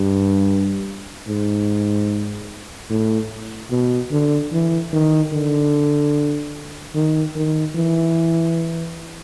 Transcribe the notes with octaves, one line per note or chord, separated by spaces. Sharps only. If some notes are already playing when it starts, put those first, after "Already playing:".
Already playing: G2
G#2
A2
B2
D3
E3
D#3
D3
D#3
D#3
E3